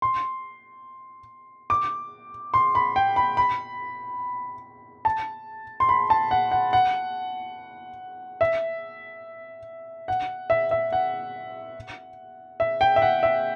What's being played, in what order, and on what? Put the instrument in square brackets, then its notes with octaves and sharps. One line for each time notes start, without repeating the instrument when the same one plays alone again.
[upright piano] C6
D6
C6
B5
G5
B5
B5
A5
C6
B5
A5
F#5
F#5
F#5
E5
F#5
E5
E5
F#5
E5
G5
E5
F#5
E5